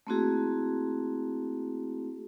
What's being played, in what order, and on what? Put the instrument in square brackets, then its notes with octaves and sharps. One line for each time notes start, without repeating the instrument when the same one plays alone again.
[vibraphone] A3 A#3 C4 E4 F#4 G#4